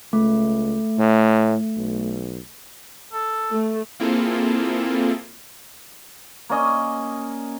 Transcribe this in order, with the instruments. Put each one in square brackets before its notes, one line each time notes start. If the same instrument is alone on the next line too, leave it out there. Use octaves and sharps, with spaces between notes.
[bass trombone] C#2 [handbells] A3
[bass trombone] A2
B1
[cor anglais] A4
[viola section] A3
[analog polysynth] A#3 C4 E4 F4 G#4 A4
[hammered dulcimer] A#3 C#4 D#5